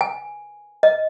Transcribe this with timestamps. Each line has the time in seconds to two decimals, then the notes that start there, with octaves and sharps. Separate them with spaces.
0.01 G#5
0.83 D#5